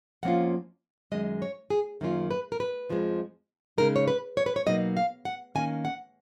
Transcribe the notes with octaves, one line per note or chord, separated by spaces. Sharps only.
F2 F3 A#3 C#4 F4 F#5
F#2 D#3 G#3 D#5
C#5
G#4
F#2 D#3 A#3 C#4 F4
B4
A#4
B4
F2 F3 G#3
C#3 G#3 D#4 A#4
C#5
B4
C#5
B4
C#5
B2 F#3 A#3 D#4 D#5
F5
F#5
D#3 A#3 C#4 G#5
F#5